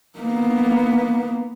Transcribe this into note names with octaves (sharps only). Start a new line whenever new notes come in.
A#3 B3